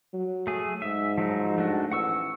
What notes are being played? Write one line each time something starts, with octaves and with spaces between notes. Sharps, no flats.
F#3
A3 G#4
G#2 E5
F3 F#3 D#4
A3 D4 F#4
A1 F#5 C#6 E6